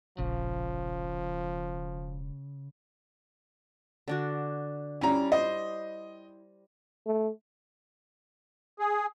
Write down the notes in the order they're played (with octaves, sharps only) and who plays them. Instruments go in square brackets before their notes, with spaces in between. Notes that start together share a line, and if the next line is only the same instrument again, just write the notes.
[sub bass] E1 [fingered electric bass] A#1 [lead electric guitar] C#3 [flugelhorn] F3
[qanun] D3 D4 F#4
[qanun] G3 E4 [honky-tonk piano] C#4 A#5
[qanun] C5 [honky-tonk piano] D#5
[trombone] A3
[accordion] G#4